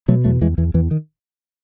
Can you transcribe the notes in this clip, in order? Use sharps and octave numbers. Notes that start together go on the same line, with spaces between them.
B2 F#3 A3
E2 F#3 A3
E2 E3 G#3
E2 E3
E2 E3
D#3